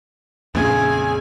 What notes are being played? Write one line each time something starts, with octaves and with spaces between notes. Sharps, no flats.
A#1 F2 C#3 G#4 G#5